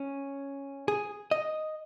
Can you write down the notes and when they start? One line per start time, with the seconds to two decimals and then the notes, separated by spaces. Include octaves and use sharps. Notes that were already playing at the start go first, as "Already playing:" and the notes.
Already playing: C#4
0.88 G#4
1.31 D#5